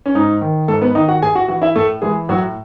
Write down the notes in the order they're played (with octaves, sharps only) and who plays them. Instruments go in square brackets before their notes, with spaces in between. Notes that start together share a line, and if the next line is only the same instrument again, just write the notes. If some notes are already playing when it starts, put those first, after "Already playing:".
[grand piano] C#4
G#2 D#4
D#3
G#2 A3 A4
B3 B4
D#3 D#4 D#5
F#4 F#5
A2 G#4 G#5
F#4 F#5
E3 F#4 F#5
E4 E5
A2 A3 A4
E3 G#3 G#4
A2 F#3 F#4